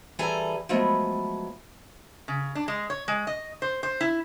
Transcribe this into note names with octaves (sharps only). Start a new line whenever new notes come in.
E3 G3 G#4 A4 G#5 A#5
F3 F#3 G#3 A3 B3
C#3
D4
G#3
C#5
G#3
D#5
C5
C5
E4